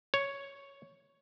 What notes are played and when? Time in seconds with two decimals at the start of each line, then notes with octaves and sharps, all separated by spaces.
0.14 C#5